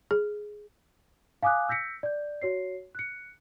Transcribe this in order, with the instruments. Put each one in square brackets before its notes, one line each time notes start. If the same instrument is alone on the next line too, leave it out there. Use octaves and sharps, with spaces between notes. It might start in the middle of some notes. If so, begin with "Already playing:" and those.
[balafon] G#4
[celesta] F5 G#5 D6 D#6 F#6
E6 G6 A#6 B6 C#7
D5 G6
F#4 C#5 C7
F#6 C#7